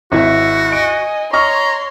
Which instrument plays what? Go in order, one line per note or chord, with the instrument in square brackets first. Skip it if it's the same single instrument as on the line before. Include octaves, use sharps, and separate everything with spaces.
[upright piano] G#1 E4 E5 [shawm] F#4
[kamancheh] D#5 G#5 [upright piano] D7
[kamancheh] C#5 C6 [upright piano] D#5 C#6 F6 [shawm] A#5